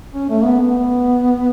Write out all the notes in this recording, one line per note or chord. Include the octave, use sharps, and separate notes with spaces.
C#4
A3
B3
B3